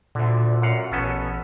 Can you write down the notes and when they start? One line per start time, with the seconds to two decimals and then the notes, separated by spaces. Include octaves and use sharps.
0.15 D2 A#2 D3
0.62 F#2 F5 F#5
0.92 A1 B3 C#4 A4